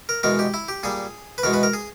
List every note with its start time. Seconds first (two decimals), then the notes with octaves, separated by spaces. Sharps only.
0.09 A#4
0.23 E2 B2 G#3 A#4
0.39 G4
0.54 E4
0.68 G4
0.83 A#2 G3 G#4
1.38 B4
1.43 E2 B2 G#3 A#4
1.53 B4
1.63 A#4
1.73 G#4